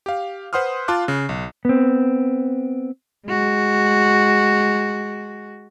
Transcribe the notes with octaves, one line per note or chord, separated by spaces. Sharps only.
G4 F5
B4 C5 F#5 C6 D#6 F6
F4 F5 A5 C6 D6 F#6
C#3
B1
B3 C4
G#3 F#4